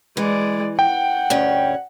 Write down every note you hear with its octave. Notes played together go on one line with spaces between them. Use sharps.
E3 G#3 D5
F#5 G5
D2 G2 C#4